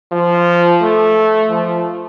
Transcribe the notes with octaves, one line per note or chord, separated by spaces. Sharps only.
F3
A3
F3